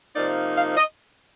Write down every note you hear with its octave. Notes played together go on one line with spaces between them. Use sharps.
C3 F3 A#3 D#4 D5
F5
D#5